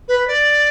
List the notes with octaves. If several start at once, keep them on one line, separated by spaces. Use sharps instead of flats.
B4
D5